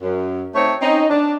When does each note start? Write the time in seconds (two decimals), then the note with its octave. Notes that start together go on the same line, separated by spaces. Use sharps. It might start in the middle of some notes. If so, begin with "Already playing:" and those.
0.01 F#2
0.55 A3 C4 D#4 C#5
0.82 C4 C#4 D#4
1.10 D4